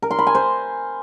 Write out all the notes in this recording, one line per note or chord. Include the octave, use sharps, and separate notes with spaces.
A#4
C6
B5
G#5
C5